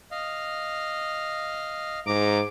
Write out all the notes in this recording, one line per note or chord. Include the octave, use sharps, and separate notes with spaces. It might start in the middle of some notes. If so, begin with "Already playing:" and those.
D#5 F5
G#2 A#5 D6